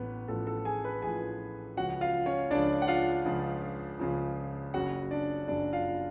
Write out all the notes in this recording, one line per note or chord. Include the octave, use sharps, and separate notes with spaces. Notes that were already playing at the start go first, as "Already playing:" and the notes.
Already playing: A1 A2 B3 B4
A1 A2 F3 A4
A4
G#4 G#5
B4 B5
A1 A2 F3 G#4 G#5
C#2 C#3 F3 F#4 F#5
F4 F5
C#4 C#5
C#2 C#3 F3 D4 D5
F#5
F4 F5
C#2 C#3 F3
C#2 C#3 F3
F#1 F#2 C#3 F#4 F#5
D4 D5
F#1 F#2 C#3 D4 D5
F4 F5